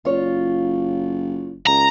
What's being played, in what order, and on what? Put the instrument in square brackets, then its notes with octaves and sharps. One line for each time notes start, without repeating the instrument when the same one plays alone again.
[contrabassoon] F#1 [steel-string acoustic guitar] F4 C#5
[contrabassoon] C#2 [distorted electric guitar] A#5